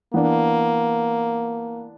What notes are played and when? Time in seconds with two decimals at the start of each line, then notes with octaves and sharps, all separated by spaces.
0.13 E3 A#3 B3 D4